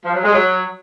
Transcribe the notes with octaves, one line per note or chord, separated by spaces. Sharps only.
F3
F#3
G#3
F#3